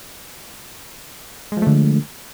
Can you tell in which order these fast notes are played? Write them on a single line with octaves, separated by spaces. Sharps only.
G#3 F3 A3 D3